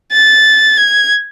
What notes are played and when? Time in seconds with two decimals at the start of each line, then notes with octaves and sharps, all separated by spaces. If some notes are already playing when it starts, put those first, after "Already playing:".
0.12 A6
0.77 G#6